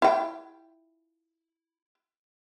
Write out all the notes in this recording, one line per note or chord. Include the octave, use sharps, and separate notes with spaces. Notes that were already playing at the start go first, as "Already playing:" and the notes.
E4 G5